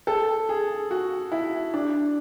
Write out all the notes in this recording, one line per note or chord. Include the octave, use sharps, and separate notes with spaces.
A4
G#4
F#4
E4
D4